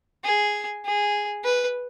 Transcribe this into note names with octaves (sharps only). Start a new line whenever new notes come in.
G#4
G#4
B4